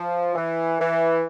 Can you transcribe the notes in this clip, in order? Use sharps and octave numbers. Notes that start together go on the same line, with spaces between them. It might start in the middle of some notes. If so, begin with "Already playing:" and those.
Already playing: F3
E3
E3